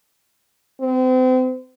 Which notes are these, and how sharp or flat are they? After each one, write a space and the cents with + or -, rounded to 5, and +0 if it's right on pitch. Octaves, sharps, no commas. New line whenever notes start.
C4 -35